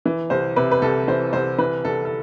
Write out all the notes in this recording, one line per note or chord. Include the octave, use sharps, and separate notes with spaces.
E3
C2 C5
C3 B4
B4
C2 A4
E3 C5
C2 C5
E3 B4
C2 A4
A4